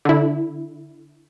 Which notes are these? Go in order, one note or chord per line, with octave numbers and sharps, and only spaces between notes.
D3 E4